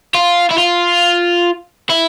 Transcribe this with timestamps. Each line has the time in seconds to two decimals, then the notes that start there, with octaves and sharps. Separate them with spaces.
0.15 F4
0.51 E4
0.58 F4
1.90 E4